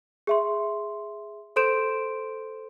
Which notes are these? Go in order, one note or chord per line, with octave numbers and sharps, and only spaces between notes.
G#4 E5 C6
A4 C5 C6 G6 D7 E7